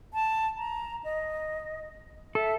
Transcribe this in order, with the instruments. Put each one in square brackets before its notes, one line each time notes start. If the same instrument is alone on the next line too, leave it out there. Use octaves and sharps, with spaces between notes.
[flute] A5
A#5
D#5
[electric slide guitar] A4 [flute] E5